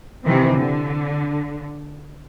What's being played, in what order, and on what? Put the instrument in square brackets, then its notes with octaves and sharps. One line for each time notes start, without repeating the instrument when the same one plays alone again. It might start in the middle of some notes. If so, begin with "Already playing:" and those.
[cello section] C3 D#3 E3 C4
D3